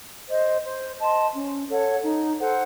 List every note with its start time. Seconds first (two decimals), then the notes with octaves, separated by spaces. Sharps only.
0.30 C5 D#5
0.64 C5
0.99 D#5 A5 C6
1.34 C#4
1.68 A4 C#5 F#5
2.03 D#4
2.38 A4 C5 F#5